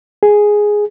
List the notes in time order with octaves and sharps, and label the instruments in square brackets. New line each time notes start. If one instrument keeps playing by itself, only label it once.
[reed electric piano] G#4